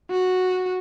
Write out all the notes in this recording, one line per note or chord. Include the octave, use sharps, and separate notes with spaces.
F#4